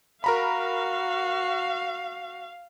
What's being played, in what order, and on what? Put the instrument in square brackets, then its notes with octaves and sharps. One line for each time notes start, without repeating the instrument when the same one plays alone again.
[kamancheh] F#4 [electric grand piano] A#4 A#5 B5 [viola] F5